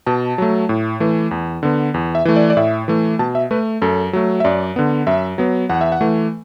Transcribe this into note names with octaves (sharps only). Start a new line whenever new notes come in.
B2 A5
F#3 A3
A2
E3 A3
E2
D3 B3
E2
E5
E3 A3
D5
D5
A2 E5
E3 A3
B2 A5
E5
A3 B4
F#2 A4
F#3 A3
E5
F#2 D5
D3 B3
F#2 E5
F#3 B3
E2 F#5
E5
F#5
E3 A3